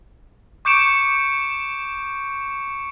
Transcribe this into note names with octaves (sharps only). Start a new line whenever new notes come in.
C#6 D6 G6 C#7 D7 E7